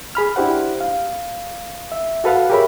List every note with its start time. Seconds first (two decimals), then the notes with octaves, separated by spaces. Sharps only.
0.15 G#4 B5 F6
0.36 D4 E4 G4 C5 F#5
0.81 F5
1.92 E5
2.24 F#4 A4 B4 F5 F#5
2.50 G4 G#4 A#4 C#5 E5 B5